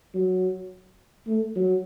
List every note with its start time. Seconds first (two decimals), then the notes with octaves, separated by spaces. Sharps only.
0.14 F#3
1.27 A3
1.56 F#3